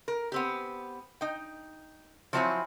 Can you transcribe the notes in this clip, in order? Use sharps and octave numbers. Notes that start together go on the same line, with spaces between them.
A#4
B3 C4 G4
D#4 G5
F3 F#3 C4 E4 C#5 G#5